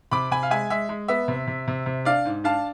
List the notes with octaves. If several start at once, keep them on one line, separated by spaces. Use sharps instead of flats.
C3 B5 D6
C3 G#5 B5
F5
G#3 E5 G#5
G#3 E5
G#3
B3 E5
C3
C3
C3
C3
D4 D5 F5
G#2
D4 F5 A5